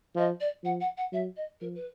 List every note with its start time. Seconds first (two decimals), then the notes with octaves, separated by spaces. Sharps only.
0.16 F3 D#5
0.40 D5
0.64 F3 F#5
0.80 F#5
0.97 F#5
1.12 F#3 E5
1.36 D#5
1.60 F3 A#4
1.75 B4